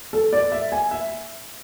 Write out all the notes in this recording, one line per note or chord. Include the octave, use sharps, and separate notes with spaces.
A4
D5
E5
G#5
E5